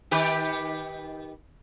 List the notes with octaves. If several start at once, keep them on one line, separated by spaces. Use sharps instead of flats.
D#3 G4 B4